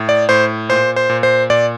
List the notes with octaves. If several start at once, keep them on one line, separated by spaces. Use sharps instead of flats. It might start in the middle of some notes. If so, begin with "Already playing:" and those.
Already playing: A2
D5
A2 C5
A#2 C5
C5
A#2
C5
A#2 D5